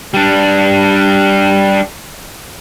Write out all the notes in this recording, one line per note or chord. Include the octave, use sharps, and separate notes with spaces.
G3 D4